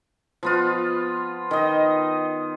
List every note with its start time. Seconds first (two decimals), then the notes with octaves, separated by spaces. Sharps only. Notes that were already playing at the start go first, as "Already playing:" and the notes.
0.43 F3 B3 F4
1.51 D#3 D#5